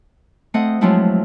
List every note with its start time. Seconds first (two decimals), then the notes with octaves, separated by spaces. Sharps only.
0.54 A3 C4 D#5 F#5
0.81 F3 F#3 G#3 A3 C4 E4